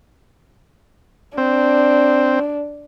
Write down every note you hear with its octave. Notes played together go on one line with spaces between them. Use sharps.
C4 D4